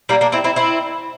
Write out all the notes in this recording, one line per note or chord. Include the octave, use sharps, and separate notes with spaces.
G3 A#3
A#3 D4
C4 E4
C4 E4
C4 E4